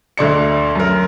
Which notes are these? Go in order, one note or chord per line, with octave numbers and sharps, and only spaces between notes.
D2 D3 D5 C#7
F#2 A#4